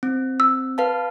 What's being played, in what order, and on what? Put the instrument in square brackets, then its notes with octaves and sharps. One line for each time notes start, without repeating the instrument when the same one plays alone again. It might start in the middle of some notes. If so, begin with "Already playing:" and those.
[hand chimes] C4
[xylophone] E6
[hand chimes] B4 F5 A5